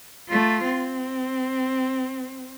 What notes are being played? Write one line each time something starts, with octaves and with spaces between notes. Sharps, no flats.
A3 F4
C4